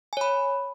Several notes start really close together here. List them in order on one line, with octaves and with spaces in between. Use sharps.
G#5 C#5 B5